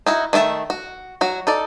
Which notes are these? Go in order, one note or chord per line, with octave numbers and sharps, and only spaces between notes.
D#4 E4 F#4
D#3 A3 B3 E5 A5
F#4
F#3 F#4
D#4 A4 D5